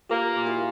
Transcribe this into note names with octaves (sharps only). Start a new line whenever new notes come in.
A#3 F4 G4
A#2
E4 F#4